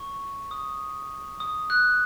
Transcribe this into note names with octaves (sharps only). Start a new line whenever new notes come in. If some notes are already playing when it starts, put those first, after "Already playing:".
Already playing: C#6
D#6
D#6
F#6